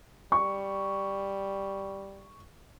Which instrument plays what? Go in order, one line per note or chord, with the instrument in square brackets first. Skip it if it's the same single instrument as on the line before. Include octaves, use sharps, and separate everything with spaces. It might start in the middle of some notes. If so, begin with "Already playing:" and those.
[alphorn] G3 [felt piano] C#6